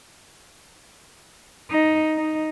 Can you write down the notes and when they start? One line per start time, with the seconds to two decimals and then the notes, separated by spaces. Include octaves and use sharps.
1.70 D#4
2.17 D#4